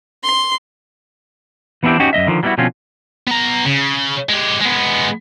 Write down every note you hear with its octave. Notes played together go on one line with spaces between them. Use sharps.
C6
E3 B3 C4 D4 E4 G4
C#4 D#4 F#4 G4
F#2 B3 D#5 E5
D3 D#3 F3
F#3 G3 B3 D#4 E4 F#4
B2 D3 F3 C4 C#4 F4
B3 A#5
C#3
G#3 G4
G#3 B3